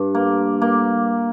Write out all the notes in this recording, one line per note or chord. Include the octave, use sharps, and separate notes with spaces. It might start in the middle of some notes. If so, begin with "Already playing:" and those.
Already playing: G2
A#3
A#3